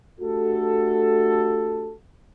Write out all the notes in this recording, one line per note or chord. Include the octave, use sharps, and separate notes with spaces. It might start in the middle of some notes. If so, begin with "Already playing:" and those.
A3 D4 F#4 G4 A4